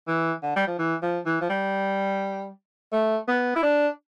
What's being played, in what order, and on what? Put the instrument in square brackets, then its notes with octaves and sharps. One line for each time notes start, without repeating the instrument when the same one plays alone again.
[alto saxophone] E3
D3
G3
F3
E3
F3
E3
F3
G3
A3
B3
E4
D4